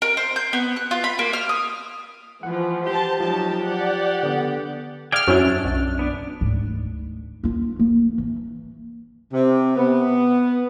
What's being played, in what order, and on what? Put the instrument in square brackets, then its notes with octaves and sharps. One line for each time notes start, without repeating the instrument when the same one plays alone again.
[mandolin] A#4
C5
G6
B3
F#6
F4
B5
A#3
F6
D#6
[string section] E3 F3 [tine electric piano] F#5
[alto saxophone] G4 [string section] C5 A5
[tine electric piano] F3 [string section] F#3 D#4 A5
[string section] D5 F#5
[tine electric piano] D3 B3
[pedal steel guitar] G#4 D5 F5 [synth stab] G5 F6
[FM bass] F#2 [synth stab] F#3 C#4 E4 [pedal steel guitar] D4
[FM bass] F#2
[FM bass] B1 [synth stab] F#2
[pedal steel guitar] B3 D4
[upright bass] D2 G#2
A#3 F4
A#3
E3
[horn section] C3
B3